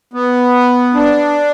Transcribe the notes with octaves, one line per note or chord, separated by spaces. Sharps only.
B3
D4